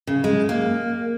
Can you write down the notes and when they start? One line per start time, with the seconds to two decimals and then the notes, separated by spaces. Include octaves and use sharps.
0.07 C#3
0.24 G#3
0.49 A#3